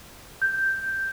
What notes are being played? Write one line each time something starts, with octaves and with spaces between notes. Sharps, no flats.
G6